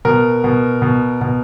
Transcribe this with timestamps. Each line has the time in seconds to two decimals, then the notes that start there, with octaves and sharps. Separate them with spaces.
0.05 B2 A#4
0.44 B2
0.82 B2
1.21 B2